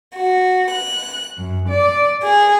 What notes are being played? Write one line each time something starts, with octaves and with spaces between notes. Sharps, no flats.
F#4
F#6
F#2
D5
G#4